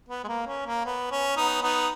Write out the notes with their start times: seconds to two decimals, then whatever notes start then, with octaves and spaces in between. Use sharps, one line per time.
0.09 B3
0.24 G#3
0.28 A#3
0.47 C#4
0.66 A#3
0.85 B3
1.11 C#4
1.37 B3 D#4
1.62 B3 D#4